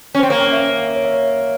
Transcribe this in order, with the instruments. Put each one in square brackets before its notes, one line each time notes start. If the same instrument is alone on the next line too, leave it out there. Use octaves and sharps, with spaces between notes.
[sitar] C#4
[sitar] C4 [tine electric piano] C5
[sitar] A#3 [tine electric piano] C#5
[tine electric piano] E5
F5
E5
C#5
E5
C#5